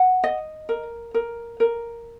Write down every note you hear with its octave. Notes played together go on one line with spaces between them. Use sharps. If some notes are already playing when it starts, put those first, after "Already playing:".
Already playing: F#5
D#5
A#4
A#4
A#4